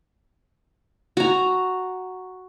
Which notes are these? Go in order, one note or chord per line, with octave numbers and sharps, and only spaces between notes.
F#4 A#5